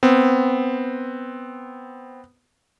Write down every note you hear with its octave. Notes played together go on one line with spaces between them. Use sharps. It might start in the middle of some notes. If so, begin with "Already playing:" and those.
B3 C4